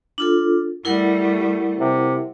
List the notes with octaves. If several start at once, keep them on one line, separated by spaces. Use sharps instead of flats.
D4 F4 A4
G3 A3 E4 A#4 F#5
C3